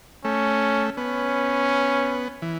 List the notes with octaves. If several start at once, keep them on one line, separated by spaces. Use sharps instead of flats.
A3 C#4
B3 C#4
E3